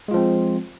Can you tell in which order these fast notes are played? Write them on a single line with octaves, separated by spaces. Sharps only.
G#3 F4 F3 C4